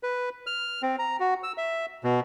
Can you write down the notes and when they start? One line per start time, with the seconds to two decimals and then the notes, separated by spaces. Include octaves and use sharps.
0.03 B4
0.47 F6
0.82 C4
0.99 A#5
1.20 F#4
1.43 E6
1.58 E5
2.04 B2